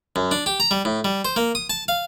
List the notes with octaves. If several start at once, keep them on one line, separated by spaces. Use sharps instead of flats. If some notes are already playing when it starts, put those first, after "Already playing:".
F#2
D4
G4
A#5
G3
A2
G3
C5
A#3
D#6
A5
F5